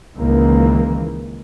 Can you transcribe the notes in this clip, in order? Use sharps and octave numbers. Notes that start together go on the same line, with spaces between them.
C#2 D#3 E3 A#3